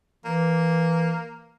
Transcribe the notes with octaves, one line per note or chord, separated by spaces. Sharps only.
E3 A#3